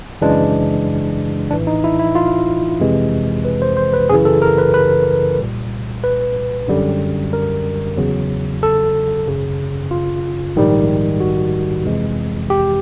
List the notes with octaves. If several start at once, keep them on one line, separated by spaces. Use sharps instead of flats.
F#2 C#3 E3 G#3 D4
A#1 A2 E3 D4
D#4
E4
E4
F4
F2 C3 E3 G#3
B4
C5
C5
B4
F#2 C#3 E3 G#4
A4
A#4
B4
B4
C2 A#2 G3
B4
F#2 D3 G3
A#4
E2 C#3 F#3
A4
G#1 F#2 C#3
F4
A#1 G#2 D#3 G3
F#4
F2 C3 E3 G#3
G4